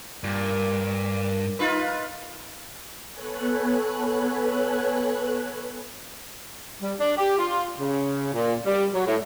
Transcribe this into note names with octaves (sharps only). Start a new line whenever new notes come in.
G2 A#2
D#4 F4 B4
B3 A4 B4 C#5 G#5 F#6
G3
D4
G4
F4
C#3
A#2
G3
F#3
A2